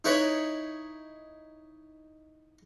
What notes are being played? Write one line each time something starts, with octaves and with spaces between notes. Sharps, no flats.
D#4 E4 B4 C#5